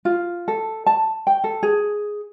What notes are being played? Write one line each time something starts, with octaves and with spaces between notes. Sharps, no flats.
F4
A4
A5
G5
A4
G#4